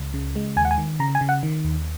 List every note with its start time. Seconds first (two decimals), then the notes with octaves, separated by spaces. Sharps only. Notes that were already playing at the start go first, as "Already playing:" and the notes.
Already playing: C#2
0.14 C#3
0.35 G#3
0.56 D#2 G#5
0.65 F#5
0.71 G#5
0.78 D#3
0.99 C#3 A#5
1.15 G#5
1.21 C#3
1.29 F#5
1.43 D#3
1.64 D#2